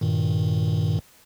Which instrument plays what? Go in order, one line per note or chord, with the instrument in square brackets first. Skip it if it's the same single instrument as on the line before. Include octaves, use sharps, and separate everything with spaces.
[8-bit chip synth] G2 A#2 D#3